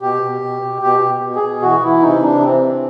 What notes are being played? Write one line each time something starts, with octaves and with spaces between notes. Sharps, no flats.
B2 G4
B2
B2
B2
B2 G4
B2
B2
G#4
B2
E3 F#4
E3 E4
C3 D#4
C3 D4
E3 C4
E3